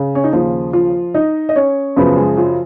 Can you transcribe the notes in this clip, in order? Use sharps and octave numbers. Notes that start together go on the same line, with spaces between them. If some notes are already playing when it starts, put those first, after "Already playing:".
Already playing: C#3
C#4
D#4
D#2 C#3 F3 F4
F3 F4
D#4 D#5
D#5
C#4 C#5
F#2 C#3 F3 B3 B4
G#3 G#4
F3 F4